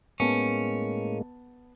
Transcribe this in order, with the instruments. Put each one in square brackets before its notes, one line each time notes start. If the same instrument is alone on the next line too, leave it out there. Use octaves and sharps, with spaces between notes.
[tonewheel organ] A2 G#3 A#3 [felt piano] B3 A5 [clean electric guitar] C#4